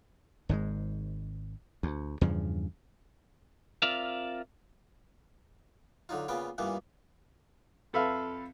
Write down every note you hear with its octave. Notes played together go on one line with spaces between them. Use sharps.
G#1 G#2 B2 G#3
D2
E2 G2 C#3 F3
C4 F4 A#4 D5 E5 F5
D3 F#3 D#4 F4
A#2 C#3 B3 F4 G5
G2 A#2 E3 A#3 B3
F2 A4 B4 E5 F5